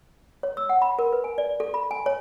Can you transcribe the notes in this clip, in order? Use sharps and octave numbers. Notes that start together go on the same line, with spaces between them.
C#5
E6
F#5
B5
A#4
B4
G#5
D5
A4
B5
G#5
C#5